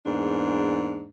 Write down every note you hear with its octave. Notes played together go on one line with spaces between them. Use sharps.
E2 G#2 A#3 D4